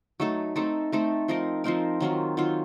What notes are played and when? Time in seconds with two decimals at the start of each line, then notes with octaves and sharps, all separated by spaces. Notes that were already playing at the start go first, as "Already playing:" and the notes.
0.20 F#3 A3 D#4 A4
0.56 A3 C4 D#4 A4
0.92 A3 C4 D#4 A4
1.28 F3 C4 D#4 A#4
1.64 F3 C4 D#4 A#4
2.00 D#3 F#3 C4 F4
2.37 D#3 F#3 C4 F4